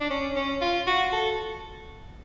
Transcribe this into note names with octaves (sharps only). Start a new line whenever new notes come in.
D4
C#4
C#4
F4
F#4
A4